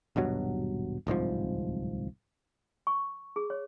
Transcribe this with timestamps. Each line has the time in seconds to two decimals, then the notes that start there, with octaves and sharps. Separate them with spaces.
0.16 D#1 G2 B2 F#3
1.07 D1 C2 G#2 F3
2.87 C#6
3.36 G#4
3.50 C#5